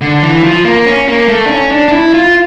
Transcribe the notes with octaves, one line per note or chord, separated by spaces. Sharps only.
D3
E3
F3
A#3
C#4
A#3
A3
D4
C#4
D4
D4
E4
F4